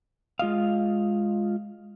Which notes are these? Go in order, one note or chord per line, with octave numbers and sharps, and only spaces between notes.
G#3 F4 D#5 F5